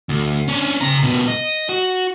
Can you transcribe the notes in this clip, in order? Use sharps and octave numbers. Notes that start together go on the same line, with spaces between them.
D2
C#4 D4
C#3 A#5
D#2 B2
D#5
F#4